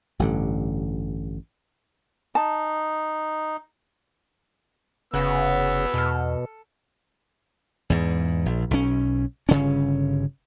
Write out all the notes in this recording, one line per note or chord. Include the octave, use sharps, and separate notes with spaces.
A1 G2 D3
D#4 A5
F1 C#3 B3 F#4 F#5 E6 F#6
E2 B2 A4 F6
E2 G#2
A#1
B1 C#4
G1 C#3 C#4